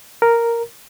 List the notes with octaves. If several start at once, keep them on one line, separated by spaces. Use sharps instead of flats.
A#4